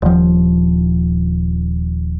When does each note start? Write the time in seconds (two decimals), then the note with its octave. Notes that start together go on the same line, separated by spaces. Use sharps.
0.02 D#1 F3